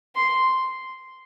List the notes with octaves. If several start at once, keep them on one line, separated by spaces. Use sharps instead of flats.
C6